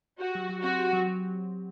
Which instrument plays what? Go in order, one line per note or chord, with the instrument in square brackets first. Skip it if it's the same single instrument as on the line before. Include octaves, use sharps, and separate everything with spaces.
[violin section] F#4 [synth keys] G4
[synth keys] F#3
F#3
[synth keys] C4 [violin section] F#4
[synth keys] G4
F#3
F#3